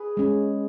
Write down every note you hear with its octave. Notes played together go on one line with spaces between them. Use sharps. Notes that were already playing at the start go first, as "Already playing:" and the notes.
Already playing: G#4 B4
G#3 C#4